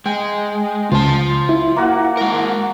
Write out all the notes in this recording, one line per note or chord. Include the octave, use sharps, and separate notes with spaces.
G#3 G5
C#2 F4 C5 A5
E4
A#3 F#4 F#5
G#3 A#4